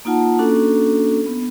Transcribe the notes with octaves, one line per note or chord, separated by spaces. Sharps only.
A#3 D#4 F4 F#5 A5
A#3 C#4 D4 F#4 A4
B3